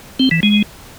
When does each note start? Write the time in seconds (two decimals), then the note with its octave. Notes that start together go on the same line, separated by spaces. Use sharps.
0.20 C4
0.31 E3
0.43 G#3